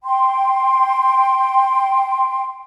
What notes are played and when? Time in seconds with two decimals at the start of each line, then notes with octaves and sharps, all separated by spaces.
0.04 G5 C6